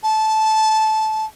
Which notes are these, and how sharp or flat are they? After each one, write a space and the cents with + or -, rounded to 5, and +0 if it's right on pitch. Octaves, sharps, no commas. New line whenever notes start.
A5 -15